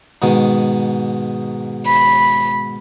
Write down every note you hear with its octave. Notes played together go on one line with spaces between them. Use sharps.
G#2 B2 D#3
B5